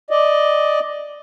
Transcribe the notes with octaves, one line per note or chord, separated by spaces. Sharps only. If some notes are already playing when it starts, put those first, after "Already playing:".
D5 D#5